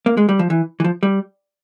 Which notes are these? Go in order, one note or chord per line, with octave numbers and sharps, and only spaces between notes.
A#3
G#3
G3
F3
E3
E3
F3
G3